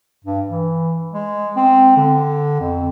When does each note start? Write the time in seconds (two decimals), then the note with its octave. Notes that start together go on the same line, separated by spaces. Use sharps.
0.24 G2
0.50 E3
1.13 G#3
1.56 C4
1.97 D3
2.60 F2